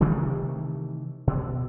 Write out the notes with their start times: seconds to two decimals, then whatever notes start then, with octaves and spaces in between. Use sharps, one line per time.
0.01 C3 D#3 E3 A3
1.27 B2